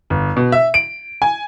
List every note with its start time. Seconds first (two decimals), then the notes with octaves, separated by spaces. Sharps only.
0.10 G1
0.37 B2
0.52 E5
0.74 D7
1.22 G#5